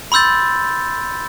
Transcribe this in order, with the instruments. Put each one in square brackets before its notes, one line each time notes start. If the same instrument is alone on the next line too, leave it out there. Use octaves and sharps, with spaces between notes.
[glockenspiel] B5 C6 E6 G6 A6